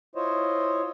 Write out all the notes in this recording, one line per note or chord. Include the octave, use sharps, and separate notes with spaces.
E4 F4 C5 C#5 D#5